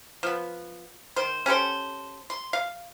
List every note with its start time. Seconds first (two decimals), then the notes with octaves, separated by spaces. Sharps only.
0.23 F3 B3
1.16 D#3 C5
1.46 C#4 G4 A4 C5
2.30 C6
2.53 F5